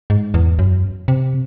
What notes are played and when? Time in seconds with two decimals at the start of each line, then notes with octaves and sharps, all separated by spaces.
0.10 G#2
0.34 E2
0.59 F#2
1.08 C3